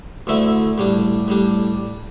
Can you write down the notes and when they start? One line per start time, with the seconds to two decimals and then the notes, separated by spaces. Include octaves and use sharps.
0.27 D2 D3 A3 E4
0.78 A2 G3 D4
1.28 A2 G3 D4